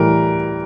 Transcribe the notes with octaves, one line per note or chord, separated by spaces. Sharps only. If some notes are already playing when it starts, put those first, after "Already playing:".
Already playing: A2 E3 G3 A#4